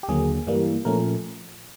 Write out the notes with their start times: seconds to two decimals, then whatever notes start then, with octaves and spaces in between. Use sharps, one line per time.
0.03 G4
0.08 D#2 D3 F#3 A#3 G#4
0.47 G2 E3 G3 A#3
0.85 A#2 F3 A3 C#4 A#4